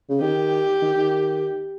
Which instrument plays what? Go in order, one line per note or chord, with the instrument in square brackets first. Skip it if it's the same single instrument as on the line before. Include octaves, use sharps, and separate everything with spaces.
[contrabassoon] C#3
[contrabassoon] D#3 [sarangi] G4
[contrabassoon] D#3
D#3